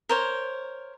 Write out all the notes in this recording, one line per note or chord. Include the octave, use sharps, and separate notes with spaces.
A#4 C5 C#5